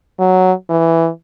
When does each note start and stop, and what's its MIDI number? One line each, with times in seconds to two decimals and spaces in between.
0.19 0.53 54
0.70 1.09 52